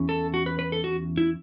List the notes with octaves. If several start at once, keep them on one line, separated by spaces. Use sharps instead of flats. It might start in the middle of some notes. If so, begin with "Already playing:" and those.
Already playing: E2 E3 C#4
A4
F#4
B4
B4
A4
F#4
E4